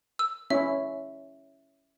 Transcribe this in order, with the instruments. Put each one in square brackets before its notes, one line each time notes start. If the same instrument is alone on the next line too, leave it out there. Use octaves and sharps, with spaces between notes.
[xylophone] E6
[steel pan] C#4 E4 [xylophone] E5